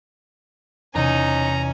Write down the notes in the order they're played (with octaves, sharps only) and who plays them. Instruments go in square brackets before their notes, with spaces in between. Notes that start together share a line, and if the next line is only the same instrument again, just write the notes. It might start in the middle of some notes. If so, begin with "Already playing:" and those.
[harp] E2 C3 [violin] C#4 G#5 [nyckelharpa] D#4 [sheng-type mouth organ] A#5